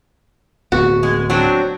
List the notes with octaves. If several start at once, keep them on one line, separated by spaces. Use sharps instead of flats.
D1 B3 F#4
G#3
F#3 C4 D4